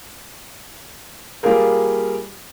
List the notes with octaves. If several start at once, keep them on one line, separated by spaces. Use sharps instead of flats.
G3 A#3 F4 G#4 A#4